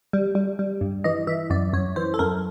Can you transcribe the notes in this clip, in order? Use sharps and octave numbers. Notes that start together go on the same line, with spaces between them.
G3
G3
G3
G2
E3 D#5
E3 E5
F#2 D5
F#2 C#5
E3 C5
A4
F#2 A#4